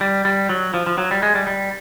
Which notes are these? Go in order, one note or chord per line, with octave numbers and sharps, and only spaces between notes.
G3
G3
F#3
F3
F3
F#3
G3
G#3
G3
G3